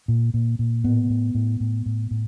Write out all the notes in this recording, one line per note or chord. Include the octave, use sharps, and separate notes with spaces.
A#2
A#2
A#2
A2 B3
A2
A2
A2
A2
A2